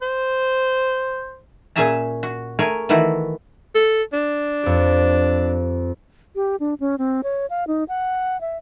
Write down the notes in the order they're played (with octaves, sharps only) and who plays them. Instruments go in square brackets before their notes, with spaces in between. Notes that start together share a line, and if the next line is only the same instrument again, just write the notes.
[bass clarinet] C5
[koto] A#2 C#4 G#4 E5 A5 A#5
F#4
A3 G#4 A#4 C#5
D#3 E3 A3 E4 F#4
[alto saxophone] A4
D4
[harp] F2 G4
[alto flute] G4
D4
C#4
C4
C#5
F5
D#4
F#5
E5